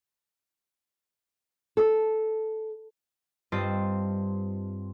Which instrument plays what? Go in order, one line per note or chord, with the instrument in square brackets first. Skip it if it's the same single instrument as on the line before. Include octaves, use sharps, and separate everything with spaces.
[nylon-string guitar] A4
[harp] G2 C4 F4 C5 D#5 A5